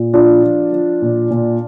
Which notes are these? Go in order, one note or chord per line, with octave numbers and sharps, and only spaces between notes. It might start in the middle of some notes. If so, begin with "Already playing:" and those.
Already playing: A#2
F3 D4 F4
F3
F3
A#2
A#2